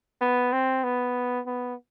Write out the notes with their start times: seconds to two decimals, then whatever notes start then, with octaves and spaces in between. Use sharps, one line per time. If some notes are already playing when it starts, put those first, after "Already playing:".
0.21 B3
0.52 C4
0.84 B3
1.46 B3